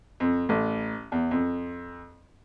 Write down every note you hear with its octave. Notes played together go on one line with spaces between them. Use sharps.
F2
A1
E2
F2